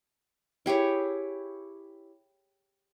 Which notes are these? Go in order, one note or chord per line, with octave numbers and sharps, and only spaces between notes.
E4 G4 G#4 C#5